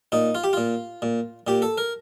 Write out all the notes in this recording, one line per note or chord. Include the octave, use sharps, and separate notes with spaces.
A#2 D#4
F4
G4
A#2 F4
A#2
A#2 G4
A4
A#4